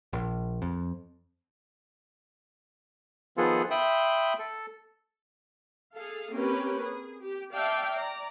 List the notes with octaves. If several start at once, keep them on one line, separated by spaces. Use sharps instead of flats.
A#1
F2
D#3 F3 B3 F4 G#4 A4
E5 G5 B5 C6 D#6
A4
G#4 A4 F5
A#3 C4 C#4 G4 A#4 B4
G#4
G4
D5 E5 F5 G5 A5
D5 A#5